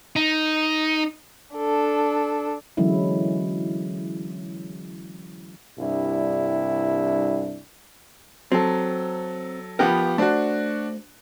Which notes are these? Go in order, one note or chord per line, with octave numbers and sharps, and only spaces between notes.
D#4
D4 A4
D3 E3 F#3 G#3 C#4 E4
C2 G2 G3 D4 E4
F#3 C4 A4
F3 B3 G4 A#4 B4 F#5
A3 D4 F#4 C5